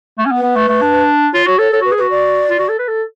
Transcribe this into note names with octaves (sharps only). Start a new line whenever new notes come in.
A3
C#4
B3
B4
B3
A3
A3
D4
F4 C#5
F#4 C#5
A4 C#5
A4 C#5
F#4 B4
G#4
F#4 B4
D5
F4
F#4
A4
B4
A4